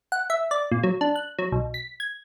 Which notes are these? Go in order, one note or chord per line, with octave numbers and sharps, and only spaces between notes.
F#5
E5
D5
A#2
F#3
D4
F#6
F#3
B1
B6
G#6